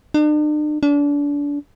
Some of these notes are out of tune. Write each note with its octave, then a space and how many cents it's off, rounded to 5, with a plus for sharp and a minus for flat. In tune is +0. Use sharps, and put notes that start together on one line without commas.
D4 +45
D4 -30